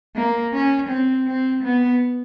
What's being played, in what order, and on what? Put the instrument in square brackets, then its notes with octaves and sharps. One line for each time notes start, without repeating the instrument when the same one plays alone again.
[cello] A#3
C#4
C4
C4
B3